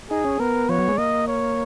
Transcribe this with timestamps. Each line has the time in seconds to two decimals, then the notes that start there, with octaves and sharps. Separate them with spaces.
0.10 D#4 G#4
0.25 C#4
0.40 B3 A#4
0.69 F3 C#5
0.79 F#3
0.88 G#3
0.98 A#3 D#5
1.27 C#5